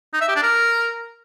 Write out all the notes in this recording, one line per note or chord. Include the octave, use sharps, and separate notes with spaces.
D#4
E5
G4
D4
A#4